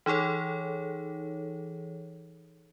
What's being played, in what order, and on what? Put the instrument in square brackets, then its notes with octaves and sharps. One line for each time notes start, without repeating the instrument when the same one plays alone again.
[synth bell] E3 D#4 G#4 A4 C#5